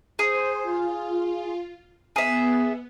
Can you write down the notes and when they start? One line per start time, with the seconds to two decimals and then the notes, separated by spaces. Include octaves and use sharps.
0.19 G#4 C5
0.63 F4
2.16 B3 G#4 E5